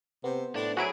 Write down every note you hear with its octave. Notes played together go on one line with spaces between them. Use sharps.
C3 B3 C5
A2 D4
F#3 E4 G#4 D7